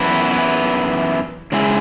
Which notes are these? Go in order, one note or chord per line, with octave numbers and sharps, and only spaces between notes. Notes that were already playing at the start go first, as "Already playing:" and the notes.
Already playing: F#2 E3 B3 E4
C#3 G#3 E4